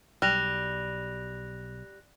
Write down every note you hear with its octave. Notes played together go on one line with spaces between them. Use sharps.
B1 G3 F#6 A#6 F7